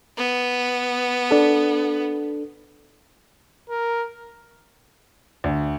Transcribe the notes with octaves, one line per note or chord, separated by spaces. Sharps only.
B3
D4 A4
A#4
D2